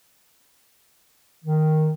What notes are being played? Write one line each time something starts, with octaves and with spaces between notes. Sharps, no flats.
D#3